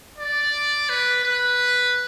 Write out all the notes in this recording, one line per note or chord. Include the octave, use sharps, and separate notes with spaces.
D5
B4
B4